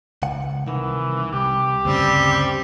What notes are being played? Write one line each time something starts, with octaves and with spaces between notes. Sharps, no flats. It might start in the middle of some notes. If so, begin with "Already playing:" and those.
C#2 F#5
C2 D#3 E3
C2 G4
D2 G2 C#3 G3 C4